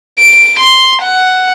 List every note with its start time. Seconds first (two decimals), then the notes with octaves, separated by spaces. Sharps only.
0.19 D7
0.60 C6
1.02 F#5